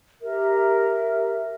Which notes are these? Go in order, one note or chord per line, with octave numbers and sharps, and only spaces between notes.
G4 A#4 E5